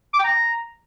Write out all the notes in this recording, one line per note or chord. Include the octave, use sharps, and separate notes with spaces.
D6
G5
A#5